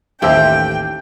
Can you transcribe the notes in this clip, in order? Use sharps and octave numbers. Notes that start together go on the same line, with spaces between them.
A1 D#2 G4 C5 E5 G5 E6